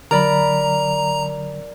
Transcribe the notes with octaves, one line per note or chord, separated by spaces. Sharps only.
D3 F#3 A#4 D5 A#5 B5